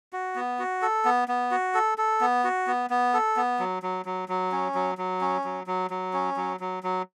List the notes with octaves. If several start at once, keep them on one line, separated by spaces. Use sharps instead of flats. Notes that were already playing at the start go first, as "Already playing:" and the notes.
F#4
B3
F#4
A4
B3
B3
F#4
A4
A4
B3
F#4
B3
B3
A4
B3
F#3
F#3
F#3
F#3
C#4
F#3
F#3
C#4
F#3
F#3
F#3
C#4
F#3
F#3
F#3